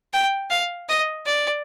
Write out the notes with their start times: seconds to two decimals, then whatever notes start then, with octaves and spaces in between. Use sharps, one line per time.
0.13 G5
0.50 F5
0.89 D#5
1.26 D5